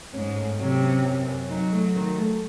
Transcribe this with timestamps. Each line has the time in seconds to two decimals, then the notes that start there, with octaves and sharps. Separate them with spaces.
0.13 G#2 C#4
0.36 A3
0.59 C3 F#3
0.82 C#4
1.05 F#2
1.27 F#2
1.49 F#3 D#4
1.72 A3
1.95 D#3
2.18 A3